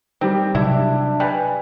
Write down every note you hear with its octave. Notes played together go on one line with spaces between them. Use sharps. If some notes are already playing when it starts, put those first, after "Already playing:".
D#3 G3 C4 G4
C3 F#3 D4 E4 E5
G3 B4 G#5 F#6